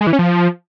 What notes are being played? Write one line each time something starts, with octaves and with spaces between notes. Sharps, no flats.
G#3
E3
C#4
F3